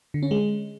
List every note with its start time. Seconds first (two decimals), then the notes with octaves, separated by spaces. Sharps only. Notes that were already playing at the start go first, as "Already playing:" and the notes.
0.14 D3
0.23 C#4
0.31 G#3